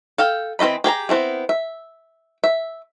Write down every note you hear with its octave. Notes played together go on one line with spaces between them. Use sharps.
A4 F5 G5
E3 C4 F4 D#5 B5
G4 G#4 G#5 A#5
B3 C4 E4 G#4
E5
E5